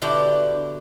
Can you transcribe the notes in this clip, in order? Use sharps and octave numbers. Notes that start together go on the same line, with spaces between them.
B2 D3 D4 E4 F#4 G4